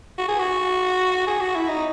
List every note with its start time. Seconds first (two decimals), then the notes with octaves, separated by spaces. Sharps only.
0.18 F#4
0.28 G#4
0.39 F#4
1.27 G#4
1.40 F#4
1.55 E4
1.68 D#4